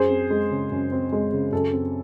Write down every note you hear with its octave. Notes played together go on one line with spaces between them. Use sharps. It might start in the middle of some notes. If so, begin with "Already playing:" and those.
Already playing: F#2 G#4 C5
C4
G#3
C#3
F#2
C4
G#3
C#3
F#2 A4
C4